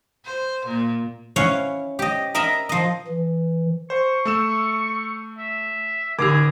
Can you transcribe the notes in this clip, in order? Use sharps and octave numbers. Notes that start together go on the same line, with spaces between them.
C5
A#2
C#4 E4 C#5 F5 F#5
G4 D#5
A#4 D#5 E5 A#5 B5
F3 D#5
E3
C5 C#6
A3 E6 E7
E5
A1 D3 D#4 G4 G#4 D6